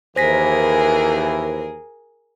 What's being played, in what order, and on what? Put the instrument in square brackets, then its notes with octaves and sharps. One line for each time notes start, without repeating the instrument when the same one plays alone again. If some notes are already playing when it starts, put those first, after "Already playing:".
[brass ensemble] D#2 E3 [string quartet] G#4 A#4 [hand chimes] C5 A#6 B6